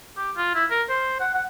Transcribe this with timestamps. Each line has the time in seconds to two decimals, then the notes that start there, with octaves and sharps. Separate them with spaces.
0.17 G4
0.36 F4
0.55 E4
0.70 A#4
0.89 C5
1.20 F#5
1.34 F#5